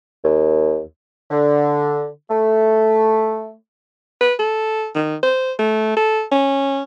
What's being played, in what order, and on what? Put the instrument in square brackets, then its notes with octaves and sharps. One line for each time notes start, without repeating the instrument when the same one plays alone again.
[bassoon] D#2
[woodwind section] D3
A3
[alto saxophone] B4
A4
D#3
C5
A3
A4
C#4